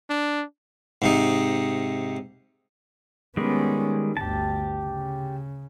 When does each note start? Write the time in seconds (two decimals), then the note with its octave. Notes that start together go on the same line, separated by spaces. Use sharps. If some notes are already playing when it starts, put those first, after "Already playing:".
0.10 D4
1.02 G#2 C3 D#4
3.37 D#3 G3 G#3 B3 C#4
4.17 G1 D2 G4 A5
4.84 C#3